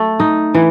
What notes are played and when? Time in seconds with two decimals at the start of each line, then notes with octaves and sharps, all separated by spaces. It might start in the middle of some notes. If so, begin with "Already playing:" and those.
Already playing: A3
0.20 D#4
0.55 E3